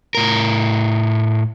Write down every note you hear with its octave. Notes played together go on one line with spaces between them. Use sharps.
A2 A#4